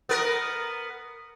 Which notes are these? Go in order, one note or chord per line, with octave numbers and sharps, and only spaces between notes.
B3 A#4